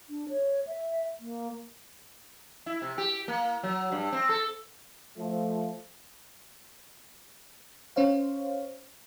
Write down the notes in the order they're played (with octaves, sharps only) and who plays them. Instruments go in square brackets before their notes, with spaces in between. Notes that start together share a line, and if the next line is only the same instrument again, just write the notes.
[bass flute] D4
C#5
E5
A#3
[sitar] E4
C3
G4
A#3
F#3
G2
C4
A4
[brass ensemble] F3 A3
[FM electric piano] C#4 C5 C#5 F5